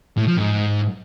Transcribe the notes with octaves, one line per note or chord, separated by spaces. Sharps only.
A2
F3
G#2